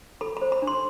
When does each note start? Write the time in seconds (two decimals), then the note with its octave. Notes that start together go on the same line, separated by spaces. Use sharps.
0.21 A4 B5
0.37 B5
0.42 C5
0.52 B5
0.62 D4
0.67 C6